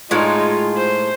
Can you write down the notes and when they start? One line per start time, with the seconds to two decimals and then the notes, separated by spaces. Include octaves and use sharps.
0.11 A2 G#3 D#4 F4 F5
0.77 C5